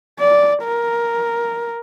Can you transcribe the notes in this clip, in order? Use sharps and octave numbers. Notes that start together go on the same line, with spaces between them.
D5
A#4